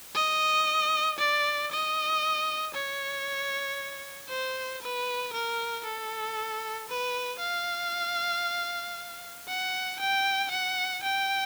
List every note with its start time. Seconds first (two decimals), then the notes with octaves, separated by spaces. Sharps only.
0.15 D#5
1.19 D5
1.71 D#5
2.75 C#5
4.29 C5
4.82 B4
5.33 A#4
5.85 A4
6.89 B4
7.40 F5
9.48 F#5
10.00 G5
10.51 F#5
11.03 G5